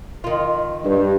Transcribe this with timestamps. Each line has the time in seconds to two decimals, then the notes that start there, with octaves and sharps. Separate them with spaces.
0.24 D#3 F4
0.83 G2